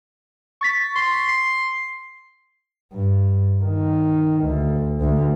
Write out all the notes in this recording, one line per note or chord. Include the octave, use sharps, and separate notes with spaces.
C#6 A6 B6
C6
C7
G2
D#3
D2
D2